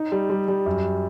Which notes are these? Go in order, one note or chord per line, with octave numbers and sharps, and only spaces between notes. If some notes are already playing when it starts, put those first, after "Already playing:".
Already playing: D#4
G3
G3
G3
F#2